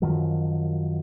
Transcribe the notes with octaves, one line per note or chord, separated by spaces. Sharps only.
F#2 D#3 F3 F#3